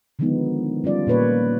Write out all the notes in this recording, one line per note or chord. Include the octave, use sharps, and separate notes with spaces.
D3 D#3 F3 G#3 B3 D#4
G3 C#4 F4 D5
A#2 A#3 B4 C#5